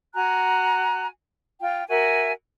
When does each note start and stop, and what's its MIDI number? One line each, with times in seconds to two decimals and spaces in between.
0.14 1.06 66
0.14 1.06 80
0.14 1.06 82
0.14 1.06 90
1.60 1.83 65
1.60 1.83 79
1.89 2.31 66
1.89 2.31 70
1.89 2.31 76
1.89 2.31 80